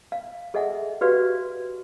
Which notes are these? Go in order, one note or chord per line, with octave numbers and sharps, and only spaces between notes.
F5
G#4 A4 D#5 E5 F#5 G#5
F#4 G4 B4 D5 F5